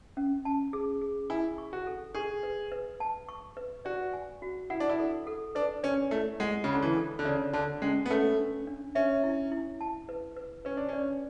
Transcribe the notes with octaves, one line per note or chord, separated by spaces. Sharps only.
C#4
A5
G#4
G#4
E4 G#5
C#6
F#4
A4
G#4 C#6
B4
B4
A5
C#6
B4
F#4 D5
G#5
F#4
E4 F#5
D4
E4
A4
A4
D4 B4
C#4 D5
A3 E4
G#3 F#5
C#3
D3 B5
E3
A4
D3
C#3 D5
D3 A5
G#3 C#4
B3
A3 C#5
D4
D4
C#4 E5
E4
E4
A5
B4
B4
C#4 B4
D4
C#4 D5